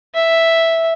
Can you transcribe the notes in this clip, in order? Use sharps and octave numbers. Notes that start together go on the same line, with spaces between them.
E5